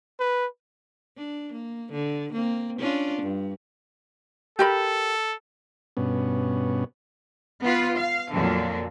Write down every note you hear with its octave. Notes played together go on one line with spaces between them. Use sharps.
B4
D4
A#3
D3
A#3 C4
C#4 D4 F4
G2
G4 A4 A#4 B5
G2 B2 B3 C#4
B3 F4 B4
F5
F2 A#2 D3 F#3